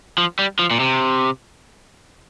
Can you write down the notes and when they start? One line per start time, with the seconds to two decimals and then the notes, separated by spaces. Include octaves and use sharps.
0.18 F3
0.39 G3
0.59 F3
0.71 A#2
0.80 C3